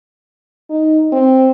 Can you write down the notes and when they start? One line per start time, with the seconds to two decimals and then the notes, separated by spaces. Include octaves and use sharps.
0.70 D#4
1.12 C4